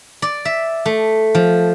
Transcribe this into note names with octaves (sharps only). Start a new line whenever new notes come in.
D5
E5
A3
F3